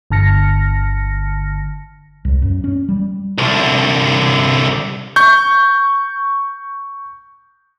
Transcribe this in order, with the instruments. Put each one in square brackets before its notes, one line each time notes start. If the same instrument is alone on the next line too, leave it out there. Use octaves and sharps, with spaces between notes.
[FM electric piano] G1 D3 A5 F6 A#6 C#7
[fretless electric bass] C2
F#2
C#4
G3
[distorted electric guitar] C2 D3
[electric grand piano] C#6 G6